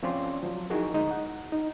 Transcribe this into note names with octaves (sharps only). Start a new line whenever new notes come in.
F3 C4 C#4 F4 D5 C6
F3 F#3
D#4 E4 F#4 G#4 A#4
D2 G#3 D#4
F#5
D#4